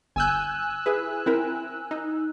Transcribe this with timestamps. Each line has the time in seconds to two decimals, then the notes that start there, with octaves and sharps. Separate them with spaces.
0.16 G1 G#5 E6 F#6 G6
0.86 E4 G#4 B4
1.26 C4 E4 A#4
1.91 D#4